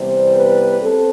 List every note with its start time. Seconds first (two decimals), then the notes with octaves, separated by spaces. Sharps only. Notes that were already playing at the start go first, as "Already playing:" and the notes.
Already playing: C3 E3 G3 B3 C5
0.35 B4
0.82 C4 A4